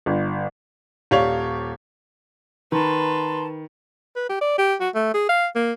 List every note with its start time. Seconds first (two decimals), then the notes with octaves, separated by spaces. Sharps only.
0.06 G1
1.11 D#1 G4 C#5 D5 F5 F7
2.72 D#3 B4 A5 A#5 C6
4.16 B4
4.29 G4
4.41 D5
4.58 G4
4.80 F#4
4.95 A3
5.14 G#4
5.29 F5
5.55 A#3